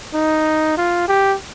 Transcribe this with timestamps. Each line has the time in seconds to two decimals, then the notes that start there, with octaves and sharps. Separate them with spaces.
0.14 D#4
0.77 F4
1.08 G4